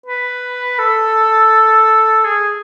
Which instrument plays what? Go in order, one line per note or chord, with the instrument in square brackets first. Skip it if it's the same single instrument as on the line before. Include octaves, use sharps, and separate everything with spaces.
[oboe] B4
A4
G#4